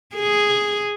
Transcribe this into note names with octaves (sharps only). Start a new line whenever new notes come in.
G#4